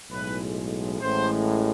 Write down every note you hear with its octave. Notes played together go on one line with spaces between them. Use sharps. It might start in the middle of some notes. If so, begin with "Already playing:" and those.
B1 A2 G#3 B4
A1 A2 G#3 C5